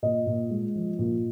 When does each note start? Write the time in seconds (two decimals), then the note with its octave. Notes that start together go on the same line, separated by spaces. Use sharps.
0.03 A#2 D#5
0.26 A#2
0.50 G#3
0.75 F3
0.99 A#2